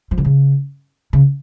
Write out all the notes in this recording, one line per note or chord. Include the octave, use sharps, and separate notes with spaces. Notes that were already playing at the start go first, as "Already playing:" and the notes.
F3
D3
C#3
C#3